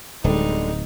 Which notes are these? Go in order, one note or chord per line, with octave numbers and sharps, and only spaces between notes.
D1 D3 G3 G#3 D#4